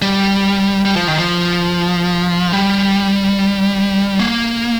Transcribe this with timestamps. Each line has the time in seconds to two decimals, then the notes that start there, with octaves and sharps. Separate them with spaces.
0.02 G3
0.85 G3
0.96 F3
1.08 D#3
1.18 F3
2.53 G3
4.19 A#3